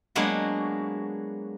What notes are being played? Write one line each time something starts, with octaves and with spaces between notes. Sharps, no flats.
F#3 G#3 A#3 B3 D4 F#4